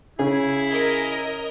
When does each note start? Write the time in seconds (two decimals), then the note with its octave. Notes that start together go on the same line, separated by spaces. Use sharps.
0.19 C#3 E4 G#4
0.71 A#4 D#5